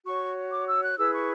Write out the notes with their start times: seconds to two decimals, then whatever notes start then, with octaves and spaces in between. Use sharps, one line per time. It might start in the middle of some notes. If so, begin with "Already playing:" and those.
0.05 F#4 C#5 C#6
0.51 D6
0.67 E6
0.83 F#6
0.97 E4 G#4 B4 E6
1.13 C#6